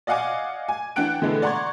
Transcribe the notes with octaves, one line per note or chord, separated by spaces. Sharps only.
D5 D#5 F5 F#5 G#5 D6
G#5
E3 D4 F#5 G5 F#6 D7
D3 E3 G#3 A3 B3 D4
D5 F#5 A#5 C6 C#6 G#6